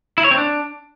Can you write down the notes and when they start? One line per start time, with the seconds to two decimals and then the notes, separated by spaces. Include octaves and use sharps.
0.18 E4
0.24 C#5
0.31 C4
0.38 D4